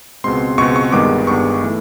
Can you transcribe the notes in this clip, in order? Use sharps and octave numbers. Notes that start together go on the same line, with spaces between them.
C#2 B2 G#3 C4 C6
C#2 B2 G#3 C4 C#6
C#6
G1 G2 D#3 G#3 B3 D6
G1 G2 D#3 G#3 B3 C#6
E3 A3